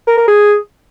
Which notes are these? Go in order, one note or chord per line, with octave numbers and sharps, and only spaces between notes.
A#4
A#4
G#4